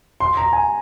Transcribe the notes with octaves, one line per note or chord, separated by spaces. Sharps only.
C6
A#5
G#5